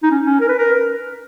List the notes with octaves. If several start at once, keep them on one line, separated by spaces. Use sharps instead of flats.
D#4
C#4
C#4
A#4
B4
A#4